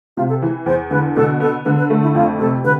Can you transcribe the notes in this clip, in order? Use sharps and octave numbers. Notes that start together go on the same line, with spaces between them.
C3 F4
A4
E3
E2 C5
D3 B4
B2 A4
B3 A4
D3 B4
B4
A3
E4
F2 F4
C3 A4
D3 B4